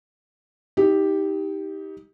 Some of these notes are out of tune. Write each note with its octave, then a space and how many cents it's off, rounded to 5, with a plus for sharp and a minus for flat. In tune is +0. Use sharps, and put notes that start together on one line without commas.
D#4 +25 G4 +0